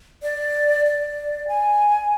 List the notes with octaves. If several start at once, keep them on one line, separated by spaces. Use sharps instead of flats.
D5
D5
G#5